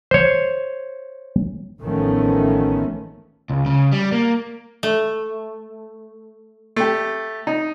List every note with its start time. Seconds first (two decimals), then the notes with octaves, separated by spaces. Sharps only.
0.11 C5 C#5
1.82 A1 D#3 F3 A3 B3 C#4
3.50 C#2
3.66 C#3
3.92 G3
4.12 A#3
4.83 A3
6.76 A3 G4
7.47 D#4